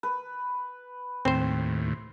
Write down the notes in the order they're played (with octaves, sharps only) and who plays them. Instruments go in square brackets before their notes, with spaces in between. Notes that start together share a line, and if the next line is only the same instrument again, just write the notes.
[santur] B4
[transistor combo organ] D#2 A2 [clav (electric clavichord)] C4 C5 [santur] C6